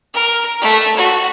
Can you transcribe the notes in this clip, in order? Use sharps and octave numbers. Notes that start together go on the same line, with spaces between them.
A#4
A3
F#4